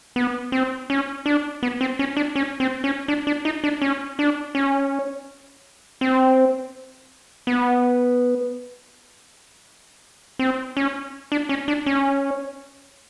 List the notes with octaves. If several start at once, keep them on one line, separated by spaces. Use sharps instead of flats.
B3
C4
C#4
D4
B3
C4
C#4
D4
C#4
C4
C#4
D4
D4
D#4
D4
C#4
D4
C#4
C4
B3
C4
C#4
D4
C#4
D4
C#4